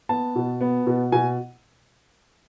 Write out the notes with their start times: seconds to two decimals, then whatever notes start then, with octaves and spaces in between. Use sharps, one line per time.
0.09 B3 A5
0.35 B2
0.61 B3
0.86 B2
1.12 B2 G#5